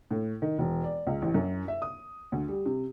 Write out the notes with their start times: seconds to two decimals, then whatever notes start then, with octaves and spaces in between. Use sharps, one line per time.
0.11 A2
0.42 D#3
0.59 E1
0.84 D5
1.07 C#2
1.22 A1
1.34 F#2
1.68 E5
1.82 D#6
2.32 D2
2.48 G3
2.66 C3